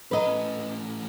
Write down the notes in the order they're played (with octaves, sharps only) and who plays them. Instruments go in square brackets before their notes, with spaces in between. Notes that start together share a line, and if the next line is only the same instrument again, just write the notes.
[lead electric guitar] F3 A#5 [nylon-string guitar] B4 D#5
[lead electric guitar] A2 C#4